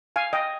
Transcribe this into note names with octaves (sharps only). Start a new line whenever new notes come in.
F5 G#5
D#5 G5